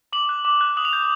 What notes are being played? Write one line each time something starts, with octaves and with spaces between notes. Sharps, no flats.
D6 F#7
F#6
D6
F#6
D#6 F#7
F7
G6